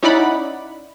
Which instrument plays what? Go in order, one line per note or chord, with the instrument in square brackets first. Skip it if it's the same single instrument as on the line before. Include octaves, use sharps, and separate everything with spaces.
[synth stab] C#4 D#4 E4 D5 F#5 B5